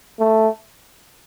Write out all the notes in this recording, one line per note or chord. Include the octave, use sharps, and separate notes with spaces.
A3